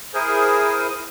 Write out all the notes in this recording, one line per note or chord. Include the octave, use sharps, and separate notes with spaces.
E4 G#4 A#4 C5 D#6